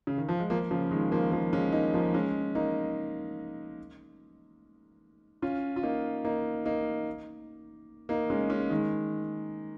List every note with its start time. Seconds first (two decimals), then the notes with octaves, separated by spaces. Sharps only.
0.07 C#3
0.18 D#3
0.29 F3
0.39 G#3
0.50 F3 A#3
0.71 C#3 F3
0.91 D#3 G#3
1.12 F3 A#3
1.32 F3 A#3
1.53 G#3 C#4
1.73 A#3 D#4
1.94 F3 A#3
2.14 G#3 C#4
2.55 A#3 D#4
5.42 C#4 F4
5.76 F4
5.83 A#3 D#4
6.25 A#3 D#4
6.65 A#3 D#4
8.09 A#3 D#4
8.30 G#3 C#4
8.50 G#3 C#4
8.70 D#3 G#3